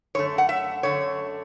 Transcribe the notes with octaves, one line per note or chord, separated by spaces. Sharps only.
F#2 D3 A3 C#5
F#5
E5
F#2 D3 A3 C#5